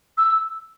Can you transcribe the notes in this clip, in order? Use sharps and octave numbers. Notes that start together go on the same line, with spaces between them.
E6